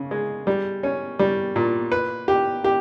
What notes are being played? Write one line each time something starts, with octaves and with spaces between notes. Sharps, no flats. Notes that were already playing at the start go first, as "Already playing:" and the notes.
Already playing: C#3
G#3
G3
C#4
G3
A#2
B4
G4
G4